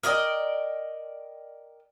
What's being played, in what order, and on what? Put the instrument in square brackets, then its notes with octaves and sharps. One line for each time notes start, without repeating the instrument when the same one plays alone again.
[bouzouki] A#4 D5 D#5 G5